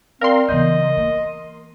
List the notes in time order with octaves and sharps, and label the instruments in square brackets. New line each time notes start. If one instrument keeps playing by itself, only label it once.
[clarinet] C4 [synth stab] A#4 C6 [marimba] D5 F5
[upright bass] C#3 F#3 [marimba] E3 B3 G6 [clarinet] D#5
[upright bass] A#3